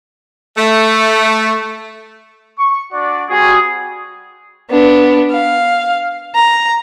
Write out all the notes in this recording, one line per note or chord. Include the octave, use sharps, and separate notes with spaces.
A3
C#6
D4 F#4 D5
G3 C4 F#4 G#4
B3 D4
F5
A#5